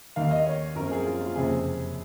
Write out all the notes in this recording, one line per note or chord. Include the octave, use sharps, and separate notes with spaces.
D#2 D#3 A#3 F5
D#5
C#5
F#2 F3 C4 A#4
G#4
F4
F4
F#1 F2 C3 G#4